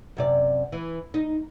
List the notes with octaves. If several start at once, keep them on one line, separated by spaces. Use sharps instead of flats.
F#2 C3 D5
E3
D#4